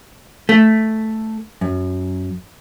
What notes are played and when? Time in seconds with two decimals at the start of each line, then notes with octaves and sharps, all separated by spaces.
0.49 A3
1.61 F#2